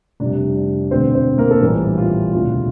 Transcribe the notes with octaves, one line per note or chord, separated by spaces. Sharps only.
F1 F2 C3 G3 D4 D5
E1 D2 D3 A3 C4 C5
C4 C5
A#3 A#4
A4
A#1 A2 E3 G3 G4
F4
E1 D2 C3 F4